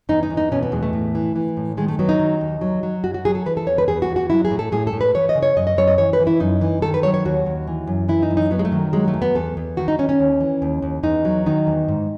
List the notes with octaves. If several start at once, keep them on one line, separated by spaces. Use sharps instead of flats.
E2 D#4
D#4
E2
D#4
B2 C#4
B3
E2 G#3
A3
A2
E3
E3
A2
D#3 G#3
A3
F#3 B3
D#4
D#3
D#2
F#3
F#3
F#2 F#4
F#4
F#3 G#4
A4
E3 B4
A4
E2 C#5
B4
E2 G#4
F#4
E2
F#4
F#3 E4
G#4
A2
A4
A2 G#4
A4
A2
B4
E3 C#5
D#5
C#3
C#5
F#2 D#5
D#5
F#2 C#5
D#5
E3 C#5
B4
E3
E4
F#2 D#4
E3
D#3 A4
B4
F#3 C#5
C#5
D#2 F#4
D#2
E3
F#2
E3 E4
D#4
F#2
D#4
F#3 B3
G#3
A3
D#3
F#3 G#3
A3
E2
B3
E2 A4
E2
D#3 F#4
D#4
D#3 C#4
C#4
D#2
E3
D#2
D#2
E2 D#4
F#3
D#3 D#4
E2
G#2